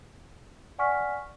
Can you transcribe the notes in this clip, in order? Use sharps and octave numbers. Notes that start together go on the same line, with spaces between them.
D5 F#5 G#5 C#6 F6 B6